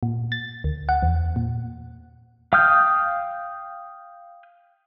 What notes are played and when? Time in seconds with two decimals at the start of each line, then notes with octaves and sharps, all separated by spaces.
0.03 A#2
0.32 A6
0.64 D2
0.89 F#5
1.02 E2
1.36 A#2
2.53 F5 G5 D#6 F6 G6